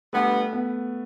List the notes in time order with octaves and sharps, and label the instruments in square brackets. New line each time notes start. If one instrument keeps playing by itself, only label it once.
[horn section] D3 G3 B3 [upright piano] A3
[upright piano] B3